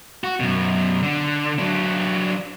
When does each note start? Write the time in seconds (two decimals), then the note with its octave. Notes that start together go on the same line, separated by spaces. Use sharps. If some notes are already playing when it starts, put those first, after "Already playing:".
0.24 F#4
0.40 F#2 B2
1.03 D3
1.58 F#3 D4